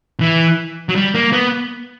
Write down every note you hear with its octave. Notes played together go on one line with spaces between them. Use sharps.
E3
F#3
G3
A#3
B3